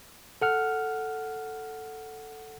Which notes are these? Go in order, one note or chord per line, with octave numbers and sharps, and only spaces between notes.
A4 F#5 F6